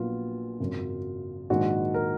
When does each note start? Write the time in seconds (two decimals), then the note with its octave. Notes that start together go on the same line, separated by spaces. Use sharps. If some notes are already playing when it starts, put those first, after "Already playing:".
Already playing: A#1 A#2 F#3 B3 F4
0.60 G#1 F#2 C#3 F#3
1.50 A#1 G#2 D#3 F#4
1.94 A#4